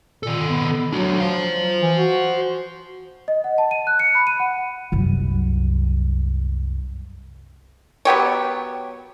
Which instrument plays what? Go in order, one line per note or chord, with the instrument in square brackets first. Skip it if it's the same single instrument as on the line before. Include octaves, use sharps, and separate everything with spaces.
[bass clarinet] A#2 [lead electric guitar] D#3 A4
[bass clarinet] B3
[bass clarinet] F#3 [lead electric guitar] D4 F#4
[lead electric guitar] C5 F5
[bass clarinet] E3
F#4
[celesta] D#5
F#5
A5
D#7
F#6
C#7
B5
D#7
F#5
[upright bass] C2 F#2
[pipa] F#3 B3 G4 C#5